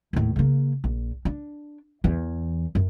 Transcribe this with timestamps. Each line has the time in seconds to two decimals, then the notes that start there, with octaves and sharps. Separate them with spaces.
0.13 D#2 A2
0.36 C#3 A#3
0.84 A#1
1.25 D4
2.04 E2 E3
2.75 F#2